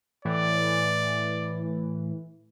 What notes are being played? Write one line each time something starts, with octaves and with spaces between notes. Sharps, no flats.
A2 E3 D5